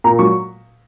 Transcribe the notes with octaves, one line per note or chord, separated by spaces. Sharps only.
A#2 A#5
F#3 C#6